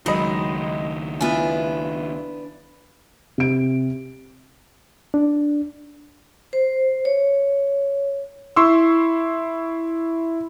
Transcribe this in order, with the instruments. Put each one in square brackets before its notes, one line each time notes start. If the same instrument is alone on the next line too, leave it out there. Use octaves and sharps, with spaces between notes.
[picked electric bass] C#2 D#3 [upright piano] F#3 D#5 [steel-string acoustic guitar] G#3 [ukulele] D#4 B5
[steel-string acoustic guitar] B3 D4 [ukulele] E4 F4 G#5
[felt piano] C3 D7
[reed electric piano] D4
[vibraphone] C5
C#5
[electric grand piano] E4 C6 C#6 E6